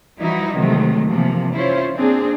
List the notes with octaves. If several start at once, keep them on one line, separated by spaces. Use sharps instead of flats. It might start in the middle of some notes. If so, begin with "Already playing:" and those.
E3 F3 G3 D#4 E4 F#4
C3 D#3 E3 F#3 G#3 A3
C3 E3 F3 A#3
C#4 E4 F4 C5 C#5
A#3 C4 D4 G#4